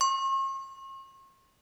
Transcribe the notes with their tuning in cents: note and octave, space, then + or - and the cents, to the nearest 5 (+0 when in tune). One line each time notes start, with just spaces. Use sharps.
C#6 -45